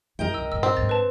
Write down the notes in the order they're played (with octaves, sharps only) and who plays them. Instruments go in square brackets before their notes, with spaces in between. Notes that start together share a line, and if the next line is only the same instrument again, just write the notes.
[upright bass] E4 [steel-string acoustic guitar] A#4 D#5 G5
[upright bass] C#2 [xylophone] E6
[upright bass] G2 A#2 [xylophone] E6
[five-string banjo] C4
[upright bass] G#2 D3 [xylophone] A6
[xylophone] B4 A5